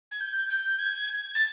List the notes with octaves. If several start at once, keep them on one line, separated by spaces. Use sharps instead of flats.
G#6
G6
G6
G#6
A6